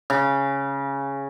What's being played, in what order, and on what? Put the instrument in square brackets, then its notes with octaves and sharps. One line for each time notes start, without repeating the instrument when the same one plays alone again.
[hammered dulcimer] C#3